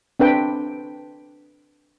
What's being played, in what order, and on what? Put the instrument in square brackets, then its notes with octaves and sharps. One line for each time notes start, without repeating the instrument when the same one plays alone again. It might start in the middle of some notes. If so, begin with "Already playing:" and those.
[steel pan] C4 D4 B4 G5